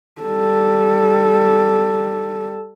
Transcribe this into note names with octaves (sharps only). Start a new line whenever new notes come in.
G3 A4